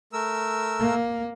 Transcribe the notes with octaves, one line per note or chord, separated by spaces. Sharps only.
A3 A#4 E6
A#3